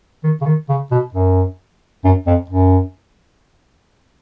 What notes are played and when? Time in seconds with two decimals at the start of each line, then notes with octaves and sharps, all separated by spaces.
0.24 D#3
0.41 C#3
0.46 D#3
0.69 C#3
0.91 B2
1.14 F#2
2.05 F#2
2.27 F2
2.50 F#2